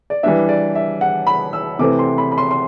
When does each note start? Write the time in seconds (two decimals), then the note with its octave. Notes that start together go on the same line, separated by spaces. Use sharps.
0.10 D5
0.23 E3 G3 D4 E5
0.49 D5
0.75 E5
1.01 F#5
1.27 B5
1.53 E6
1.79 C3 E3 A3 C4 D6
1.99 C6
2.18 B5
2.32 B5
2.38 C6
2.51 C6